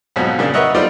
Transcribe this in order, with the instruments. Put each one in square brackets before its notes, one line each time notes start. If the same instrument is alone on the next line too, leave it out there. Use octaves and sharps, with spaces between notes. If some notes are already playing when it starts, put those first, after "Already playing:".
[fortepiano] F2 G#2 B2 F3 F#3
A#2 C#3 A#3 D4
A#4 B4 C#5 D#5 E5 F#5
G3 A3 D#4 F4 C5 D5